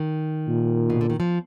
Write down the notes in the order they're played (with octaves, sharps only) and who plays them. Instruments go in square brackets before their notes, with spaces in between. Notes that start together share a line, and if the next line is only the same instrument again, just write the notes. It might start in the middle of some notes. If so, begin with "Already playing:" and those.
Already playing: [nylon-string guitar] D#3
[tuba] A#2
[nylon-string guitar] B2
D3
D#3
F3